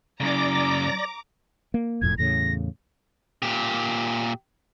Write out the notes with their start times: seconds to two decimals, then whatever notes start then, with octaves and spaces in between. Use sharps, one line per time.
0.20 F#2 C#3 D5 A#5 D6 A#6
1.74 A#3
2.01 E1 F2 A2 G#6
2.18 E2 A2 C#3 A#6
3.42 A#2 G4